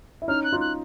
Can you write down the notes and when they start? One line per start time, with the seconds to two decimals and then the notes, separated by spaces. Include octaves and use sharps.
0.22 E4
0.28 C#4 D#4 F6
0.44 F#6
0.52 D#4 F4
0.61 F#6